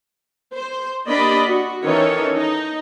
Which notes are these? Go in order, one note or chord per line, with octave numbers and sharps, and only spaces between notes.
C5
A#3 D4 G4 D5 D#5 B5
F#4
D#3 E3 C#4 D#4 A4 C#5
D#4